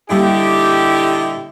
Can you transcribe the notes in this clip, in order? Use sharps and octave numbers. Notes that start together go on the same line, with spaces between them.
A#2 D3 G3 A#3 D#4 E4 G4